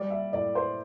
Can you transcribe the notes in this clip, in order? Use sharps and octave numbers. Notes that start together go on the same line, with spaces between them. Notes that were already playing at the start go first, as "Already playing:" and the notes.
Already playing: G3 D5
E5
A2 D5
C5